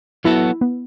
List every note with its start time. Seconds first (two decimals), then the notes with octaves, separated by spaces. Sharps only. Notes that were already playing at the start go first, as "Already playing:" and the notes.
0.24 F#3 B3 E4 F#4 A4
0.61 B3